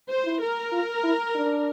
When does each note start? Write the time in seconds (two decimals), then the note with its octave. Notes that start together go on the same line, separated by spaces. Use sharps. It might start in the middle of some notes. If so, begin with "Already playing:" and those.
0.08 C5
0.25 E4
0.41 A#4
0.72 F4
1.03 E4
1.35 D4